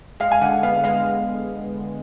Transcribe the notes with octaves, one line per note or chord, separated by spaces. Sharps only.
G#3 F5
G#5
D3 F#5
B3 F5
G#3 F5